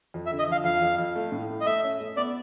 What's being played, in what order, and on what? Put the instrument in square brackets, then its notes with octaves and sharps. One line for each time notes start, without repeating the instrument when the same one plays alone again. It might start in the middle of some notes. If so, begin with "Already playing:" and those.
[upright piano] F2
[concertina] E5
[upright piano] D3
[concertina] D#5
[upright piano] F3 [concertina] F5
[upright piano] F2 [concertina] F5
[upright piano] F2
F2
A3
A2
A3
[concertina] D#5
[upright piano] A3 [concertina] E5
[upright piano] C#4
A3
[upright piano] B3 [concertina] D5